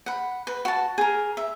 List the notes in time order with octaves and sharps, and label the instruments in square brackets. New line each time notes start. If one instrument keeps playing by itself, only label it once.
[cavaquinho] F#5 B5
B4
F#4 A5
G#4 A#4
E5